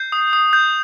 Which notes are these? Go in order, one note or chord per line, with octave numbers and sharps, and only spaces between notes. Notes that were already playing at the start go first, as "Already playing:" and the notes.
Already playing: G6 C7
D#6
D#6
G6